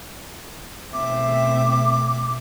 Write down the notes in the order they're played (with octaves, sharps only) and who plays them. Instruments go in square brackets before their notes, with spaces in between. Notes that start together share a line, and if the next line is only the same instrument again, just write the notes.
[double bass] B2 A3 [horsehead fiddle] C4 E5 [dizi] D6